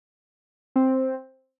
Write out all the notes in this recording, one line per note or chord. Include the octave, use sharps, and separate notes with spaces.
C4